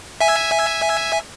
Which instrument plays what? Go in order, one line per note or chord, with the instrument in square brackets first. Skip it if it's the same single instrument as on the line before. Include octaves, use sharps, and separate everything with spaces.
[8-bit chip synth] E5 G#5